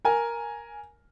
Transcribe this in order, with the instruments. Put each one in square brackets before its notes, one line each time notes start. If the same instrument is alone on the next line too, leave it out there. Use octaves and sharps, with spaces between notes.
[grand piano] A#4 G#5